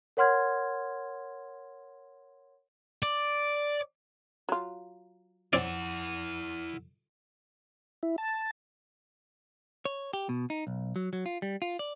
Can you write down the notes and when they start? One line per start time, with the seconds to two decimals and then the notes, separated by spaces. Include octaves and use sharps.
0.17 A#4 C#5 F#5 C6 F6 G#6
3.03 D5
4.49 F#3 F4
5.53 F2 C4 C#4 E4 D5 F#5
8.03 E4
8.18 A5
9.85 C#5
10.13 G4
10.29 B2
10.50 D#4
10.67 B1
10.96 F#3
11.13 F#3
11.26 F4
11.42 G3
11.62 F4
11.79 D5